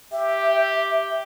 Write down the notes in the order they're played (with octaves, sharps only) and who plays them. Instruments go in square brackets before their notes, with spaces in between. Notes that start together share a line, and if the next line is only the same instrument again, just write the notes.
[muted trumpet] G4 [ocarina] E5